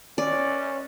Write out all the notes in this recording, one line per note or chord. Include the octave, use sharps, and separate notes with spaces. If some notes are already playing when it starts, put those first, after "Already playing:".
C#4 D5